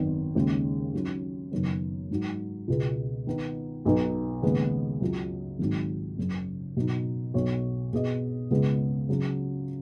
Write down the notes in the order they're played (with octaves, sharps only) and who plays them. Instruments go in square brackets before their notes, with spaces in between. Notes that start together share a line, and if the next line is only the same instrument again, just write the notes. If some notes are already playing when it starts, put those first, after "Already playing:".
Already playing: [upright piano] G#1 F#2 D#3 B3
D#2 C#3 G#3 C#4 G#4
D#3 F#3 C#4
F#1 F#2 D#3 B3
G#2 F#3 D#4 F#4
C#2 B2 B3 G#4 B4
D#3 B3 D#4
B1 B2 B3 D#4 B4
D#2 C#3 G#3 B3 G#4
C#2 C#3 F#3
G#1 G#2 D#3 F#3
F#1 F#2 C#3
B2 F#3 D#4
B1 B2 B3 F#4 C#5
B2 B3 G#4 D#5
C#2 C#3 G#3 B3
C#3 F#3 C#4 F#4